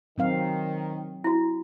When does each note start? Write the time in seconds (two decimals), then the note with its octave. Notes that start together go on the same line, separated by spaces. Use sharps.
0.18 D#3 F#3 C4 F5
1.24 E4 F#4